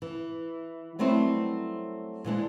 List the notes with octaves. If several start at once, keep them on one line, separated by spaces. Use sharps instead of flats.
E3
F#3 G3 A3 B3 C4 E4
A#2 E3 G#3 D4